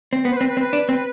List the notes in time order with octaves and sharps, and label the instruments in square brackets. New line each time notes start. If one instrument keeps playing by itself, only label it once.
[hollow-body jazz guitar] C4
B3
[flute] C5
B4
[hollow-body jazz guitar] C4
[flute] B4
[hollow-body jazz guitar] C4
[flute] B4
[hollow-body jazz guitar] D4
C4